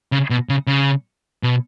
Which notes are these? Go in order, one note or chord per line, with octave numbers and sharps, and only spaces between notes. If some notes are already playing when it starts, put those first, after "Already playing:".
C#3
B2
C#3
C#3
B2